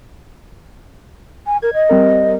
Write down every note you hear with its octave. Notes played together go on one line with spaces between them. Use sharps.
G#5
A#4 G#6
D#5
G3 C4 A#4